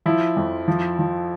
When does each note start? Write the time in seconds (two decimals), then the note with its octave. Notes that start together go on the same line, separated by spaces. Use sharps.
0.06 F3 E4
0.37 F2
0.68 F3
0.99 F3